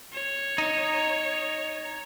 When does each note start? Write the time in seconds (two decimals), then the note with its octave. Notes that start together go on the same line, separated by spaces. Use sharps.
0.13 C#5
0.58 D#4